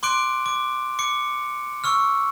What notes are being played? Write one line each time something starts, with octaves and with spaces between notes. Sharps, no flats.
C6 D6 F#6 D7
D6
D6 C#7
C#6 E6 F6